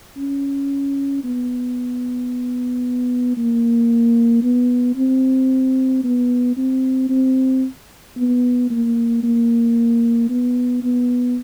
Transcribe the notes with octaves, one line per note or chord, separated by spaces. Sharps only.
C#4
B3
A#3
B3
C4
B3
C4
C4
B3
A#3
A#3
B3
B3